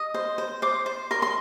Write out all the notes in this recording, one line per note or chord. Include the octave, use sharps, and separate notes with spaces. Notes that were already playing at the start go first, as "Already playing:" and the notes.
Already playing: D#5
C5
C5
C5 D6
C5
A#4 C6
C6